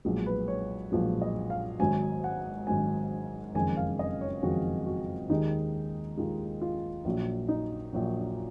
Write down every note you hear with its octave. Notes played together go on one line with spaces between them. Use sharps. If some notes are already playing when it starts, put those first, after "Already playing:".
B1 A#2 F3 G#3
B4
C#5
B1 A#2 F3 G#3
D#5
F5
G#1 G#2 F#3 G#5
F#5
G#1 G#2 F#3 G#5
F#1 F2 D#3 G#3 G#5
F5
D#5
C#5
F#1 F2 D#3 G#3 F#4
F#4
D#2 D#3 G#3 D#4
D#2 D#3 G#3 F4
F4
A#1 A#2 F#3
D#4
A#1 A#2 F#3 F#4